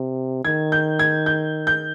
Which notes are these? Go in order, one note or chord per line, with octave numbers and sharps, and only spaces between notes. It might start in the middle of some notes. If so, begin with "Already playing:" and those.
Already playing: C3
D#3 G#6
G6
G#6
G6
G6